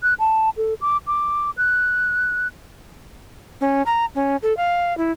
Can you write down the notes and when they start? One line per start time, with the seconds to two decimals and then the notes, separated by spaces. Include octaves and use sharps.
0.03 F#6
0.19 A5
0.57 A4
0.81 D6
1.07 D6
1.57 F#6
3.61 C#4
3.86 A#5
4.15 C#4
4.43 A4
4.57 F5
4.98 E4